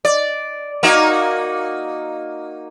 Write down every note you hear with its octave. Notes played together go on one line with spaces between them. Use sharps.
D5
A#3 D#4 F#4